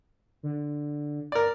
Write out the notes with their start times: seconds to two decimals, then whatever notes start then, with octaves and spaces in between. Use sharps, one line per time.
0.43 D3
1.32 A#4 D5